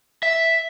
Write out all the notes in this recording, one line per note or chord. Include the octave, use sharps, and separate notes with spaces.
E5